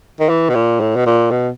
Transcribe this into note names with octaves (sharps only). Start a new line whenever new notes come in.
D#3
E3
B2
A#2
A2
B2
A#2
B2